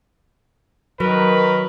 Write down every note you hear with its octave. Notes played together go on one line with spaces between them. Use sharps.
D#3 F#3 A#4 B4